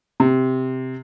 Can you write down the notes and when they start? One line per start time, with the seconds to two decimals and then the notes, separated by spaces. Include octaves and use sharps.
0.20 C3